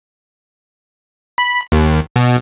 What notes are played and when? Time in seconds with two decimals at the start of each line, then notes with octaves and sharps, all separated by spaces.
1.38 B5
1.72 D#2
2.16 B2